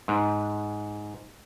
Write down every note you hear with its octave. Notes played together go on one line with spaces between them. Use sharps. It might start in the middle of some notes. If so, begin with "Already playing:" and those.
G#2